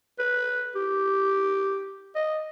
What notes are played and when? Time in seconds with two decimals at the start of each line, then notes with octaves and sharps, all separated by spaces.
0.19 B4
0.75 G4
2.15 D#5